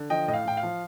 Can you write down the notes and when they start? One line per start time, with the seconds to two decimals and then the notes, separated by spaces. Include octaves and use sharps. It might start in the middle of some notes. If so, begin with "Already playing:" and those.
Already playing: D3
0.10 F3 D#5 G5
0.28 A2 D#5
0.34 F5
0.45 A2 G5
0.57 F5
0.63 F3